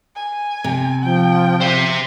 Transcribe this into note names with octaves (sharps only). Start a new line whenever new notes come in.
G#5
C3
F3 G5
F3 C5 E5